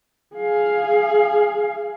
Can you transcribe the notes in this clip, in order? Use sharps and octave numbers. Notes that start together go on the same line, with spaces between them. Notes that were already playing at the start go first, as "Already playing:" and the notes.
G#4 F5